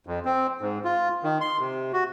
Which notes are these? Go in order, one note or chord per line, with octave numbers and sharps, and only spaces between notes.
F2
C4
G#2
F4
D#3
C6
C3
F#4